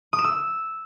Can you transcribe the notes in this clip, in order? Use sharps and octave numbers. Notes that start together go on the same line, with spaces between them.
D#6
E7
E6